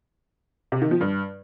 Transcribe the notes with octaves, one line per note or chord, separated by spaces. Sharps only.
C3
D#3
F3
G2